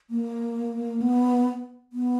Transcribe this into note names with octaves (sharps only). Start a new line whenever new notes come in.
A#3
B3
B3